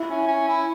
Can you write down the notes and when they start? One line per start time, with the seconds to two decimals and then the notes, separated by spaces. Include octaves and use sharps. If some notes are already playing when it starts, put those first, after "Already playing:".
Already playing: E4
0.08 C#4
0.27 C#4
0.48 E4